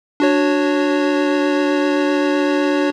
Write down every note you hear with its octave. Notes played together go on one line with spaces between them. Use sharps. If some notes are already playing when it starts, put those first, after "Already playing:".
D4 F#4 C#5